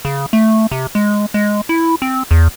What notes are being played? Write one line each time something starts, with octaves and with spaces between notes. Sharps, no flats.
C#3
A3
C3
G#3
G#3
E4
C4
E2